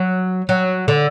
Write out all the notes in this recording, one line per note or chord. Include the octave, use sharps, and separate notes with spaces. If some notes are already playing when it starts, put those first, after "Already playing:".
Already playing: F#3
F#3
D3